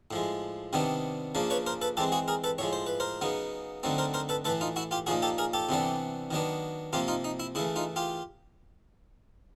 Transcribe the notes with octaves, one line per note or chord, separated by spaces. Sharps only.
A2 F3 G#3
C3 D#3 G3 B3 D4
C#3 F3 A#3 D4
B4 C#5
A#4 C5
A4 B4
E3 G#3 C4 G4 A4
F#4 G#4
G#4 A#4
A4 B4
A2 F3 G#3 C#5
C5
B4
A#4 C5
C#3 F#3 B3 D#4
D3 F#3 A3 C4 D#4
A#4 C5
A#4 C5
A4 B4
A2 E3 A3 A4 B4
D#4 F4
E4 F#4
F4 G4
A#2 F3 A#3 D#4 F#4 G#4
G4 A4
G#4 A#4
G4 A4
C3 E3 G3 B3 D4
D#3 F#3 B3 D4
C3 F3 A#3 F4 G4
D#4 F4
D#4
E4
C#3 E3 A3 E4
D#4 F4
F4 G4